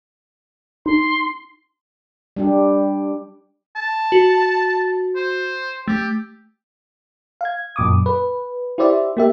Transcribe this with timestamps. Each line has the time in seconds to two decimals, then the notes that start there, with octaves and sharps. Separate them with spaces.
0.86 D#4 C6
2.36 G3 D4 G4
3.76 A5
4.12 F#4
5.16 C5
5.88 A3 G4
7.41 F5 G#6
7.76 F#2 A#2 D6 D#6
8.06 B4
8.78 E4 G4 C5 D5 E5
9.17 A#3 G4 E5